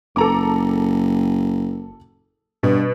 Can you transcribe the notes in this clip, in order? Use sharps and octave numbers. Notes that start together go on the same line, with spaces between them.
F#1 A4 A#5 D6
G2 B2